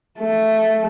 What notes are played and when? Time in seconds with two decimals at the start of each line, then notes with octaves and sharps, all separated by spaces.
0.20 A3